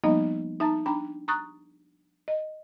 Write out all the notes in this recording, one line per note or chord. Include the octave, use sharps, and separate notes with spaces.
F3 G3 A#3 B3 D#4 D#5
D#4 E5 A5 A#5 A6
D4 G5 A#5 B5
A#5 C#6 D#6 F#6 A6
D#5